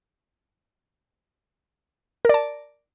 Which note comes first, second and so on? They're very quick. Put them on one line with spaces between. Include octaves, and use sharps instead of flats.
A#4 D5 A5